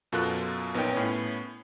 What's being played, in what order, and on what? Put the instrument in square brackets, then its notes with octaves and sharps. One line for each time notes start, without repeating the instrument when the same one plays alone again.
[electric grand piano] F#2 B2 F4 A4 A#4 F#6
A#1 B3 D#4 A#4 C#5 G5
A2 B3 C#4